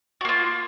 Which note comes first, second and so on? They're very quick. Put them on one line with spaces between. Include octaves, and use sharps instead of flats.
F#4 A#3 F4